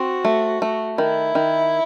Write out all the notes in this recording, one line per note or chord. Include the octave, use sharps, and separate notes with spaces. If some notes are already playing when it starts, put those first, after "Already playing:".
Already playing: C4 F#4
A3
A3
D#3 E4
D#3